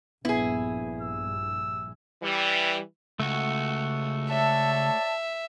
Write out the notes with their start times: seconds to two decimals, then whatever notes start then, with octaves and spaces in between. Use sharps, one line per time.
0.25 A#1 G2 B3 E4 G#4
1.01 E6
2.22 E3 G3
3.20 C#2 A3 F#4
4.30 C#5 D5 E5 A5